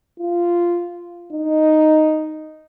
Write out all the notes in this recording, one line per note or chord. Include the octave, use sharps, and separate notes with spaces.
F4
D#4